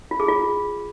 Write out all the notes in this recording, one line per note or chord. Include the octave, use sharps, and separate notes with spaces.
F4
G#4
F4